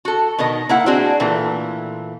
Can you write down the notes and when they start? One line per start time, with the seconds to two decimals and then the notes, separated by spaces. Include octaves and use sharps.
0.05 F#4 A4
0.38 B2 D#3 B3 D#5
0.69 A#3 E4 F#5
0.86 C4 D4 F#4 G#4
1.20 A#2 E3 A3